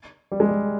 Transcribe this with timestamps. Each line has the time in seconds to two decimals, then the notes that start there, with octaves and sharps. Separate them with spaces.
0.32 G3
0.40 G#3
0.48 G3